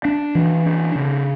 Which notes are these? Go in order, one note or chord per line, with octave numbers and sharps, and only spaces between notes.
D4
E3
D4
C#3